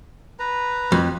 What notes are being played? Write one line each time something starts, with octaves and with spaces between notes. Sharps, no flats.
B4 A#5
F2